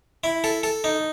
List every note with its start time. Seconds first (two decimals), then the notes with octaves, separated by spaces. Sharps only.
0.24 E4
0.44 A4
0.63 A4
0.84 D#4